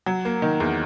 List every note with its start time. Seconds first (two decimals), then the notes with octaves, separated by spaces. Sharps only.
0.06 F#3
0.25 A#3
0.42 D#3
0.60 E2